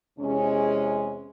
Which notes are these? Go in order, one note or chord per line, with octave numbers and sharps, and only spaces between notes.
E2 C3 G#3 C#4